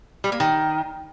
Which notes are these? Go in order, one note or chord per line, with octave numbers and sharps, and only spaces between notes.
G3
A#3
D#3